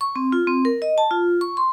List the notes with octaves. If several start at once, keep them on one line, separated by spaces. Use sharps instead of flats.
C#6
C4
F4
C4
A#4
D#5
A5
F4
C#6
C6